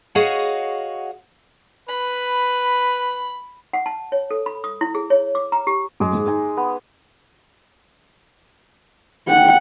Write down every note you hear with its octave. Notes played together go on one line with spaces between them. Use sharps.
F#4 G#4 C#5 D#5 F5 F#5
B4 B5
F#5
A5
C#5
A4
B5
D#6
E4
G#4
C#5
D6
A#5
G4
F#2 G#3 G#4 D6
G#2
D#4 G#5
B3
F#5 G5